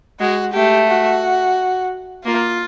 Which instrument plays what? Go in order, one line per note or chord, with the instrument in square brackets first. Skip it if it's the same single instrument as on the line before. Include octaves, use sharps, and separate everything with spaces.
[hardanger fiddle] G#3 [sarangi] F#4
[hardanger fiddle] A3 [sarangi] G4
[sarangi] F#4
[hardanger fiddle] A#3 [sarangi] F4